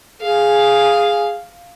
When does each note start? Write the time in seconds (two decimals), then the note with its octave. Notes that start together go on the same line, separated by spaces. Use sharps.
0.22 G#4 F5